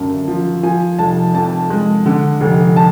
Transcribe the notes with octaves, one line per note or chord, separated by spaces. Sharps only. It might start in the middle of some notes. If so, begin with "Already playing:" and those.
Already playing: G#1 F#2 D3 A5
F3
F3 G#5
F1 A5
F2 A5
G#3
D3
F1
A5